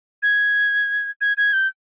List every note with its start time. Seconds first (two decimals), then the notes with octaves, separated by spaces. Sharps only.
0.23 G#6
1.21 G#6
1.37 G#6
1.53 G6